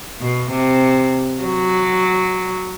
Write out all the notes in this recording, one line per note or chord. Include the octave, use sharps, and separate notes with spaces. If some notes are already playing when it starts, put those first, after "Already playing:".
B2
C3
F#3